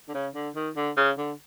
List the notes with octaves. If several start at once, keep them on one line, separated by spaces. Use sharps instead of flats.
D3
C#3
D3
D#3
D3
C#3
D3